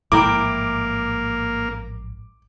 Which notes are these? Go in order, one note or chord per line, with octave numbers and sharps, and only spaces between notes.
A1 G#2 F3 A#3 E4 A#4 G5 D6